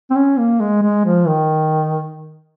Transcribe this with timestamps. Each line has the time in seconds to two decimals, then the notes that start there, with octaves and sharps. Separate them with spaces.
0.10 C4
0.16 C#4
0.38 A#3
0.60 G#3
0.83 G#3
1.05 F3
1.27 D#3